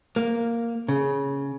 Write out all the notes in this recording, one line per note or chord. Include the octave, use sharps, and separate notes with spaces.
A#3
C#3